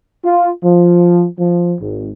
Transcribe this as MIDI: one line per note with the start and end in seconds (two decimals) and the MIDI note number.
0.24 0.50 65
0.63 1.25 53
1.38 1.74 53
1.81 2.11 32